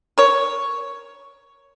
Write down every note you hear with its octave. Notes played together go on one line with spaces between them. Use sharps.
A#4 C#5